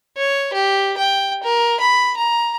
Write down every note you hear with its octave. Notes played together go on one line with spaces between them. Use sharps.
C#5
G4
G5
A#4
B5
A#5